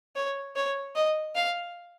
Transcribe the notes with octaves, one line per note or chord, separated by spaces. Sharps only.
C#5
C#5
D#5
F5